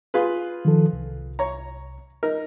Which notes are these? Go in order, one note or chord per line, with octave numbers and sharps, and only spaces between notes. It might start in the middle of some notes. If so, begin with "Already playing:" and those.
F4 G#4 B4
D#3 F3 A4
C2
C#5 A#5
D#4 A#4